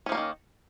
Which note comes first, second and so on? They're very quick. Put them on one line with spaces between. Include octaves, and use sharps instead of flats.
C#4 F3 A#3 G3 D#3